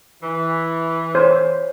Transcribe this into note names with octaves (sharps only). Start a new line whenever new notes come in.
E3
C5 C#5